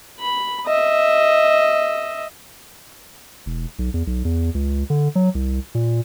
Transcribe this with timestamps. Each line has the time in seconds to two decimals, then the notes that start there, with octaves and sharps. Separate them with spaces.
0.20 B5
0.66 D#5 E5
3.46 E1
3.79 B1
3.94 E2
4.07 B1
4.25 E2
4.55 C#2
4.90 D3
5.15 F#3
5.35 C2
5.75 A#2